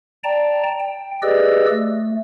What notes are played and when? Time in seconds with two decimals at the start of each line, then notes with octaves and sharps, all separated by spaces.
0.24 D5 G5 A5 A#5
0.80 G5
1.22 G4 G#4 B4 D5 D#5 E6
1.70 A3